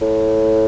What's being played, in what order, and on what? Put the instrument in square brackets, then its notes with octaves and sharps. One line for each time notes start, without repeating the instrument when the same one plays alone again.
[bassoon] A2